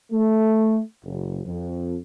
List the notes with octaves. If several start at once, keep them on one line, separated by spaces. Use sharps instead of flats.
A3
F#1
F2